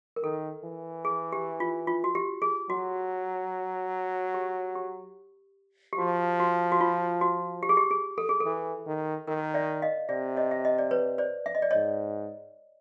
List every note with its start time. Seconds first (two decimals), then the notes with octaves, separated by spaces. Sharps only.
0.16 A#4
0.23 D#3 A4
0.64 E3
1.05 G#4
1.32 G4
1.60 F4
1.87 F4
2.04 F#4
2.15 G4
2.42 G#4
2.70 F#3 F#4
4.34 G4
4.75 G4
5.93 G4
5.98 F3 F#4
6.40 F#4
6.72 F#4
6.81 F4
7.21 F#4
7.63 G4
7.69 G#4
7.77 G4
7.91 G#4
8.18 A4
8.29 G#4
8.40 A4
8.45 E3
8.87 D#3
9.27 D#3 A#4
9.54 D5 E5
9.82 D#5 F5
10.09 C3 D5 E5
10.36 C#5 D#5
10.51 E5
10.65 D#5
10.78 D5
10.91 B4 C#5
11.18 C5 D5
11.46 E5
11.55 D#5
11.62 D5
11.71 G#2 C#5 D#5